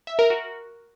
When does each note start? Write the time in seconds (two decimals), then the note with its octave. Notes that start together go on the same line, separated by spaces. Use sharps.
0.07 E5
0.19 A#4
0.30 F#4